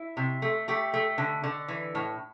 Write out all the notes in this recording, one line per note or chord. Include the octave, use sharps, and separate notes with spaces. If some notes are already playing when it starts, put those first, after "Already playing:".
Already playing: E4
C3
A3
A3 G4
A3
D3
D3
E3
A2